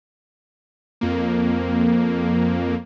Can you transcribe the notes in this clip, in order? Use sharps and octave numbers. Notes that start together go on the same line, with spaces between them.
F2 A#3